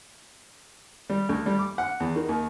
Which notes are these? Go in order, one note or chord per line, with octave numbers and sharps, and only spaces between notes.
G3
D2
G3
D6
F#5
E2
D#3
D#2